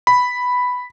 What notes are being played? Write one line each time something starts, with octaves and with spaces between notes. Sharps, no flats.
B5